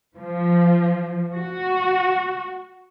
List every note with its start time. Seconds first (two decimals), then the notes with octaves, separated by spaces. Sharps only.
0.16 F3
1.34 F#4